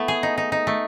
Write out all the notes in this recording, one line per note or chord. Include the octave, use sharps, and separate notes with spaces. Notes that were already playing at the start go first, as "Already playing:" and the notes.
Already playing: A3 B3 E4
G#4
D#4
D#4
D#4
A3